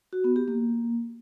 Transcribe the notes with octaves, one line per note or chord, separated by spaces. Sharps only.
F#4
B3
G4
A#3